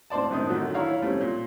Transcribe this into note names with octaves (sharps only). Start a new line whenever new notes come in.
A2 C4 C5 D5 A5
F#2 A2 D#3 C4 D#6
D3 D#3 F#3 A3
E4 C#5 F5 A#5
G3 A3 C4 C#4
A#2